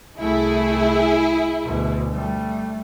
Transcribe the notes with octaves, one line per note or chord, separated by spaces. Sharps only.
C2 A3 E4 G#4
D2 B2
G3 A3